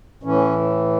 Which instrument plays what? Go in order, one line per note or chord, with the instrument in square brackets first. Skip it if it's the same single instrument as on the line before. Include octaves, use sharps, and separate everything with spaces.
[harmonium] A2 E3 C#4